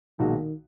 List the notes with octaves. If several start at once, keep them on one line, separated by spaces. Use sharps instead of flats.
B1 A#2 D#3 G#3 D#4 F#4